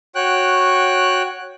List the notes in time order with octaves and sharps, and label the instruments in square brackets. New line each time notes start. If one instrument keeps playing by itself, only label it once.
[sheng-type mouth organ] F#4 C#5 G5 F#6